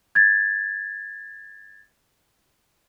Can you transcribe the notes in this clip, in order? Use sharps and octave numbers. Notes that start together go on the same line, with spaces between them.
G#6 A6